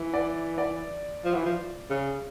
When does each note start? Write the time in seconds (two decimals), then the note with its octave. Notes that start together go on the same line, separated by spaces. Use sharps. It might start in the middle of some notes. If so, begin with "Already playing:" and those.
Already playing: E3
0.14 D5
0.58 D5
1.24 F3
1.34 E3
1.45 F3
1.90 C#3